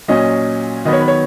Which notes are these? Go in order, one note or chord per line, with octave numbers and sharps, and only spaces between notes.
A#2 F#3 C#4 D#5
D#3 F#3 B3 D#5
C#5
B4
C#5